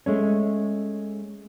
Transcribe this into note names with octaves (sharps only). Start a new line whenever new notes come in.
G#3 A3 C#4